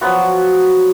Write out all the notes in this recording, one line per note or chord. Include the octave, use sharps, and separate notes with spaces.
F3 F#3 B3 F#4